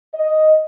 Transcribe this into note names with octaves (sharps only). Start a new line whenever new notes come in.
D#5